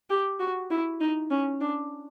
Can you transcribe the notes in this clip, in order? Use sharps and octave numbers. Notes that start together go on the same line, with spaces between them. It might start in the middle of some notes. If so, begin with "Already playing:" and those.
G4
F#4
E4
D#4
C#4
D4